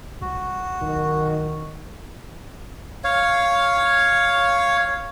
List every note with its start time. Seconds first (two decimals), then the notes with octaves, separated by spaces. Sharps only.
0.21 C2 F#4
0.82 B1 D#3
3.04 C#5 F5